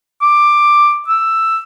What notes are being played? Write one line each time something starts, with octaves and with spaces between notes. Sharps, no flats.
D6
E6